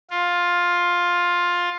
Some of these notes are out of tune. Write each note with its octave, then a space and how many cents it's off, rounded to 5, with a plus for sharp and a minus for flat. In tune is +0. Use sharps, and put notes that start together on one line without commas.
F4 +10